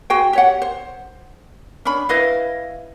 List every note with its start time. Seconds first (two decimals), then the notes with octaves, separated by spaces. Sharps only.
0.10 F#4 G#4 C5 G5
0.33 G4 C#5 F#5
0.62 C5
1.85 C#4 D4 B5
2.09 E4 B4 D#5 F5